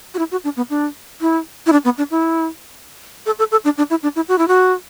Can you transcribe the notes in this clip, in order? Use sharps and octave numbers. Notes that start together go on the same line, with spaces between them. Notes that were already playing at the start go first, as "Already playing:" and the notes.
F#4
E4
F#4
D4
B3
D4
E4
E4
D4
B3
D4
E4
A4
A4
A4
D4
D4
E4
D4
E4
F#4
E4
F#4